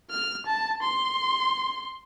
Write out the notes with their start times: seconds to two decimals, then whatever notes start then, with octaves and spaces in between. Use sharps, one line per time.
0.11 F6
0.46 A5
0.82 C6